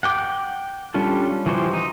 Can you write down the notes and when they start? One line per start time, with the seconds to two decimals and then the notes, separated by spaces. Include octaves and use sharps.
0.03 F#5 G5 D6
0.94 G3 C#4 D4 F4 A4
1.46 E3 F3 F#4 G4 C6
1.74 D#4